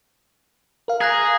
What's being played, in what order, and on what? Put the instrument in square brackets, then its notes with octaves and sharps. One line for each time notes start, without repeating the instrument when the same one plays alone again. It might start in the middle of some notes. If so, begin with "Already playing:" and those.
[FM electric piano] A#4 F5
[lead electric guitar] G#4 [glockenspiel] A#5 F#6 A#6